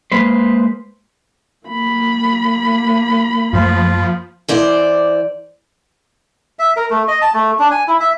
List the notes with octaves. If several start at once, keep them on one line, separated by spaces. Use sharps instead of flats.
G#3 A#3 B4 C5
A#3 B5
F#2 F3 A3 F4
E3 C5 D5
E5
A#4
A3
D#5
A5
A3
D4
G#5
E4
E5